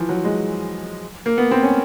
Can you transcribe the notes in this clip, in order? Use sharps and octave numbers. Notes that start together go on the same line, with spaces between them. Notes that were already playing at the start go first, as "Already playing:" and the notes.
Already playing: E3 F3
F#3
G#3
A#3
B3
C4
C#4